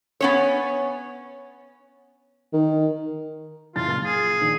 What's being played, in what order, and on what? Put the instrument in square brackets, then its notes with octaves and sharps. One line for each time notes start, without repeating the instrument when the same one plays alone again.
[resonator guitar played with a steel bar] B3 C#4 C#5
[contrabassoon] D#3
[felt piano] F#1 E4 A6 [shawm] F4
[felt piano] A#2 F6
[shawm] G#4
[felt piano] A#1 D#3